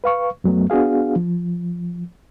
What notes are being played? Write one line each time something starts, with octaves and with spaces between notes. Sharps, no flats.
B4 F5 C#6
F#2 F#3 A3 B3
B3 D4 F#4 G#4 F5
F3